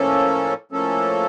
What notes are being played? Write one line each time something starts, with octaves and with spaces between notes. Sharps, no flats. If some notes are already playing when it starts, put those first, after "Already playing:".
Already playing: A2 F3 A#3 C#4 A4
A2 F3 A#3 C#4 A4